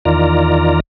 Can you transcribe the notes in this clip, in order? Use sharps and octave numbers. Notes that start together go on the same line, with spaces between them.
E2 D#3 F4 D5 A#5